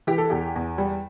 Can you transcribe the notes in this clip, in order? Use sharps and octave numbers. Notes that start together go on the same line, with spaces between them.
E3 G4
A4
E2 G4
E2
G3